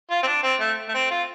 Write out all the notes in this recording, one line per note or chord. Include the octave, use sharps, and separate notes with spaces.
F4
C4
D4
C4
A3
A3
C4
F4